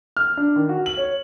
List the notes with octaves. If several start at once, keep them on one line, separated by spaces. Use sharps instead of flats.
F6
D4
D#3
F#4
F#7
C#5